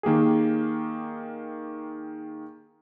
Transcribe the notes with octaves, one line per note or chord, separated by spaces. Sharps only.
D#3 A#3 G4 G#4